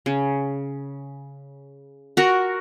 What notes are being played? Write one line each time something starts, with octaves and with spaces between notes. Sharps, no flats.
C#3
F#4 A#4